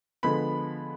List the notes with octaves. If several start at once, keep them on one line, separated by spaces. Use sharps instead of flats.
D3 F3 G#3 B3 B5